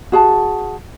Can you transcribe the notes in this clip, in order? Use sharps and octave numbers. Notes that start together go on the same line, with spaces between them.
F#4 G#4 A5